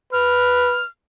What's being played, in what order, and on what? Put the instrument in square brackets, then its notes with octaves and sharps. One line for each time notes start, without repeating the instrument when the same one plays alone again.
[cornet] B4 [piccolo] F6